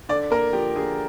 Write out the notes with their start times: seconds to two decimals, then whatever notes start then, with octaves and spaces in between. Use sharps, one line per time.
0.09 D3 D5
0.30 A#3 A#4
0.53 F3 G4
0.76 D3 G#4